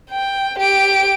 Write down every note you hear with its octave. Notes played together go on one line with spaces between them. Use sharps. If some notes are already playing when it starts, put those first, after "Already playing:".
G5
G4 D7